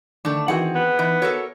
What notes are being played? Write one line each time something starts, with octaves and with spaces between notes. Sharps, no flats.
D3 D#3 A3 D4
D#3 E3 C4 F#4 G#4 F#5
B3
E3 D#4
F#4 A4 A#4 C#5